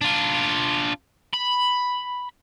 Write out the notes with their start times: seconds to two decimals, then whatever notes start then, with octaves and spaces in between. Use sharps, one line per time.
0.01 D4 F4
1.33 B5